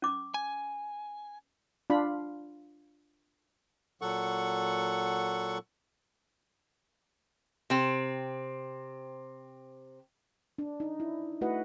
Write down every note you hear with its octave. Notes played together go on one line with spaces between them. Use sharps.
C#4 D6
G#5
D4 F4 B5
A#2 F#3 A4 F#5 C#6
C3 C4
D4
D#4
E4
A3 E4 F#4 B4 D#5 F#5